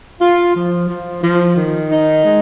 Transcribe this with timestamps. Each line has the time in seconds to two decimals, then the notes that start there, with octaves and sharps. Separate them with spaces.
0.20 F4
0.54 F3
0.88 F3
1.22 F3
1.56 D#3
1.90 D#4
2.24 G#3